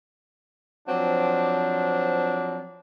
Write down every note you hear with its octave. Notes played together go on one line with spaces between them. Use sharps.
F3 F#3 C4 D4